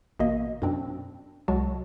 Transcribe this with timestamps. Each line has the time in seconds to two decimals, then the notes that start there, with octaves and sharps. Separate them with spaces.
0.19 A1 B2 A#3 D#5
0.62 F#2 B2 C4 D4
1.48 C2 F#3 G#3 F#4 A5